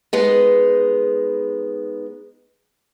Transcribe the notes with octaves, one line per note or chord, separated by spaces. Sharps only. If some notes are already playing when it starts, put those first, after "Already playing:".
G#3 B3 D#4